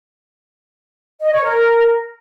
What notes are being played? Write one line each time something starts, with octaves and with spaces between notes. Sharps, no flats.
D#5
C#5
A#4